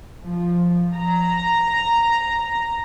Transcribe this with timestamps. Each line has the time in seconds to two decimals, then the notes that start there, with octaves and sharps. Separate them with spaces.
0.22 F3
0.95 A#5